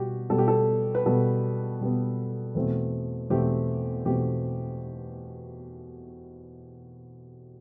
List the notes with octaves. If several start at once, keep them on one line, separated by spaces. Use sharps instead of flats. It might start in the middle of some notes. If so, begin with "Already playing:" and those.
Already playing: B2 G3 F#4 G4
B2 G3 B3 A4
G4
A4
B4
B2 G3 B3 A4
B2 G3 B3
E2 B2 A3 C4
E2 B2 A3 C4 G4
E2 B2 A3 C4 G4